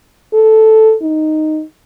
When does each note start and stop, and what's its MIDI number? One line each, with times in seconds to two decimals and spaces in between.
0.34 0.95 69
1.02 1.63 63